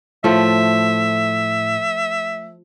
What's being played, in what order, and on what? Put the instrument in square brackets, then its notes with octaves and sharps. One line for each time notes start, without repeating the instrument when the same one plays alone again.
[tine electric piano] A2 [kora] F3 A3 [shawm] E5